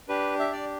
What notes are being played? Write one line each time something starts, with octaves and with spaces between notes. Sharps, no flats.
D4 G4 B4
E5
D5